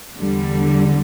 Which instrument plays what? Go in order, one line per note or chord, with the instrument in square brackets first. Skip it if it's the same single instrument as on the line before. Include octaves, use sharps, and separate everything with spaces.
[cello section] E2 D3 G3